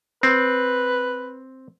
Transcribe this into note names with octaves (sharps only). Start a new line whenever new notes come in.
C4 B4